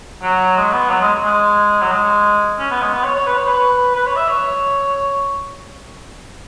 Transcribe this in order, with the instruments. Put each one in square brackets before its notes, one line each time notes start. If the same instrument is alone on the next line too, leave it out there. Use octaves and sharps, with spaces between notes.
[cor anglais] F#3
G#3
B3
F#3
G#3
G#3
F#3
G#3
C#4
B3
G#3
B3
C#5
C#5
B4
C#5
B4
B4
C#5
E5
C#5